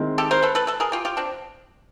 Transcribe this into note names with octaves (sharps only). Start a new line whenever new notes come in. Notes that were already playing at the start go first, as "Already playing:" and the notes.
Already playing: D#3 G#3 C4 E4
G4 A4
A#4 C5
A4 B4
A4 B4
A4 B4
G#4 A#4
F4 G4
F4 G4
C4 D4